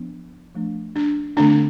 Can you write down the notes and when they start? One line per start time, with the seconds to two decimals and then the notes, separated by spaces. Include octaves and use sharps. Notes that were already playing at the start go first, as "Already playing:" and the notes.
Already playing: F3 B3 D4
0.55 F3 A3 D4
0.96 D4
1.37 D3 A3 C4 D4